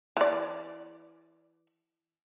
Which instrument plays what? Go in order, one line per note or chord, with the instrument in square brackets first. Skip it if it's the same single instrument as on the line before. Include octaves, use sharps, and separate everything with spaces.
[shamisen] E3 D5